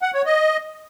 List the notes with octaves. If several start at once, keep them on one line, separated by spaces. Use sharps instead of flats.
F#5
C#5
D#5